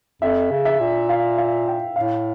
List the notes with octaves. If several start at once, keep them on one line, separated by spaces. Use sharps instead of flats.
F2 E5
C#3
E5
A#2
F5
F5
G5
A2 F5